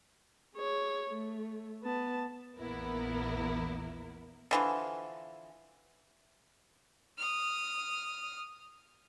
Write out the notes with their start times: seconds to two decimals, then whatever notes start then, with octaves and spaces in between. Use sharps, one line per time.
0.55 G#4 C#5
1.10 A3
1.83 B3 A5
2.57 A#1 E2 A#3 B3 E4 A#4
4.51 D3 E3 F3
7.18 D#6 F6